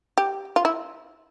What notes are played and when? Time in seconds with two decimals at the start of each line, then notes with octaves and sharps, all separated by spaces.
0.18 G4
0.56 F4
0.65 E4